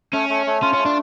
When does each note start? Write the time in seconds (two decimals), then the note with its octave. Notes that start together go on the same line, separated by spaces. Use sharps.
0.13 A3 C#4
0.30 A3
0.46 A3
0.62 C#4 F4
0.73 A3 C#4
0.86 D4